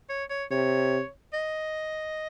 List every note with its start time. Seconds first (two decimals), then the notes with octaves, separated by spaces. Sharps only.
0.10 C#5
0.30 C#5
0.51 C3 C#5
1.33 D#5